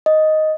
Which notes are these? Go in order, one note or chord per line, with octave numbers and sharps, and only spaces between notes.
D#5